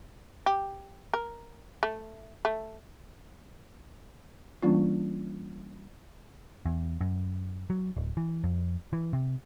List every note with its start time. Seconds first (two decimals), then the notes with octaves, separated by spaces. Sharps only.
0.46 G4
1.13 A#4
1.83 A3
2.45 A3
4.62 E3 G3 A#3 C#4 D4 F4
6.65 E2
7.01 F#2
7.70 F#3
7.97 D1
8.17 E3
8.44 F2
8.93 E3
9.13 C3